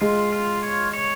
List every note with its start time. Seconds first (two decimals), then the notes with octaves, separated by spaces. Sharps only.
0.01 G#3 F4
0.32 F4
0.63 C#5
0.93 C#5